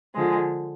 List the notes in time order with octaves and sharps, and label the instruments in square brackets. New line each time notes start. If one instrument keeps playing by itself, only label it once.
[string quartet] D3 F3 G#3